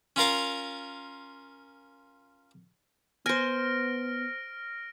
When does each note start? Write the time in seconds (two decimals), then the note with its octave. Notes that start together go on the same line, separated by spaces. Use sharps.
0.16 C#4 F4 A#4 F5
3.26 B3 C5 G#5 F6 A#6 D7